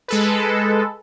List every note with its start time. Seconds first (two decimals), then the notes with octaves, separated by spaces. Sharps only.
0.08 G#3 A4 B4